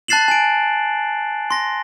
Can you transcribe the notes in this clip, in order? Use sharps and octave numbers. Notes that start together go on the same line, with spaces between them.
A5 F#6 A6 C7 E7 F#7
G#5 D7
C6 A#6